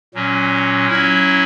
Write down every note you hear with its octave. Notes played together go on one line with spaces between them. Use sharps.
A#2 F#3 C#4
F#3 C#4 E4